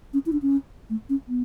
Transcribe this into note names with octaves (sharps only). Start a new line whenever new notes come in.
C#4
E4
D4
C#4
A3
C#4
B3